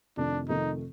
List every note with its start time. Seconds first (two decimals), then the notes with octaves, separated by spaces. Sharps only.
0.17 F2 C3 D#3 A3 D4
0.49 F2 C3 D#3 A3 D#4